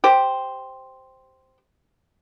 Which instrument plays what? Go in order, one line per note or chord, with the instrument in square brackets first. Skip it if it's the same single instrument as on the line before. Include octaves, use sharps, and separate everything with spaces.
[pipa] G4 C5